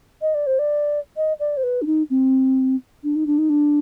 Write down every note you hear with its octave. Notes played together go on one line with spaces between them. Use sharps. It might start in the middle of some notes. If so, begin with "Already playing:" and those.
D#5
D5
C5
D5
D#5
D5
C5
B4
D4
D#4
C4
D4
D#4
D4
D#4
D4